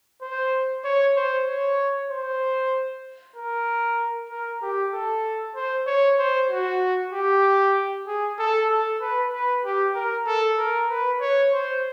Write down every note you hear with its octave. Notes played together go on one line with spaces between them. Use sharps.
C5
C#5
C5
C#5
C5
A#4
A#4
G4
A4
C5
C#5
C5
F#4
G4
G#4
A4
A4
B4
B4
G4
A#4
A4
A#4
B4
C#5
C5